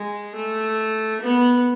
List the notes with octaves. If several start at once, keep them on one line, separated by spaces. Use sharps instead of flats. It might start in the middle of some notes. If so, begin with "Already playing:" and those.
Already playing: G#3
A3
B3